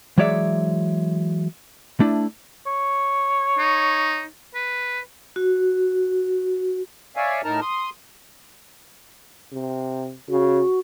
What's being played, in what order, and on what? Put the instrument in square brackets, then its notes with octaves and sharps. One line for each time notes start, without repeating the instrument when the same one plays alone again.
[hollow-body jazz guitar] E3 F#3 G#3 C#5 D5 E5
A3 D4 E4
[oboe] C#5
[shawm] D#4
B4
[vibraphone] F#4
[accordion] C#5 D5 E5 F5 G#5
A2 D#4 A#4 A5 A#5 F6
C6 D#6
[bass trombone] C3
[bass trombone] C#3 [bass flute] F#4